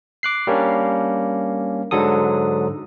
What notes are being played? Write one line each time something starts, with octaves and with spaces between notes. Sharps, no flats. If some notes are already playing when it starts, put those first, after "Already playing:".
D6 F#6 C7
G3 A#3 C#4 D4
G#2 D3 F#3 A4 D#6